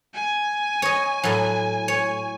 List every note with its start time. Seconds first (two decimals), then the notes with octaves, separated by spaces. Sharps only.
0.14 G#5
0.82 C#5 D#5
1.23 A2 F#3
1.88 C#5